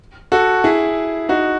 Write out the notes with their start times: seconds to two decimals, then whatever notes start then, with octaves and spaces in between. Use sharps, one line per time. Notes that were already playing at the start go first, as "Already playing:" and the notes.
0.32 F#4 A4
0.64 E4 G#4
1.29 D#4 F#4